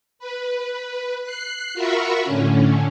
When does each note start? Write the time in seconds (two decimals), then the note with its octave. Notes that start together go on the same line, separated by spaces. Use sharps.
0.19 B4
1.23 F#6 C7
1.74 F4 F#4 A#4 E5 B5 C#6
2.24 A2 D3 C#4